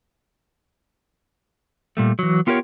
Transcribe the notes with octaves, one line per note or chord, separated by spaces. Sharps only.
A#2 G3 A3
E3 F#3
B3 F4 G4 A#4 B4 C#5